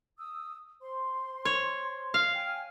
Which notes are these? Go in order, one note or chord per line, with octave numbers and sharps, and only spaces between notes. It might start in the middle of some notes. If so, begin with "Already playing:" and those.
D#6 E6
C5 C6
C#5
F5
G5 G#5 F6